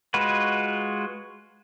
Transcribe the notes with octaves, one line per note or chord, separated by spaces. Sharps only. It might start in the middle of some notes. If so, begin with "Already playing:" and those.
G#3 F4 F#4 B4